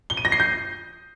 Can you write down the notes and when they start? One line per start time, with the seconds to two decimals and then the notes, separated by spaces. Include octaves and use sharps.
0.10 G7
0.17 D#7
0.25 A#6
0.32 C7
0.40 G6